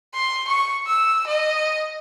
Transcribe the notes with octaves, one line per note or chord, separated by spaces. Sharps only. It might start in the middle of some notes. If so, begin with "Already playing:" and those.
C6
C#6
E6
D#5